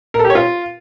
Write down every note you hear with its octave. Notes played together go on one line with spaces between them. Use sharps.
A#4
A4
G4
C#5
F4